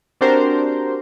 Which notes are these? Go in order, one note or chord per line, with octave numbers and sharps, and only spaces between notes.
C4 D4 F#4 G4 A#4 C5